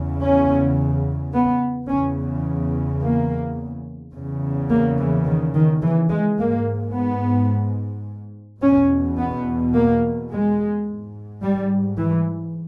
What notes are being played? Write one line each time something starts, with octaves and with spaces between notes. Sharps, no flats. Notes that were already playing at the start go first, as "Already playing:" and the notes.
Already playing: E2 C#3
C#4
B3
E2 C#3 C#4
A#3
E2 C#3
A#3
E3
D#3
D#3
E3
G#3
G#2 A#3
B3
E2 B2 C#4
B3
A#3
G#3
G#2
G3
E3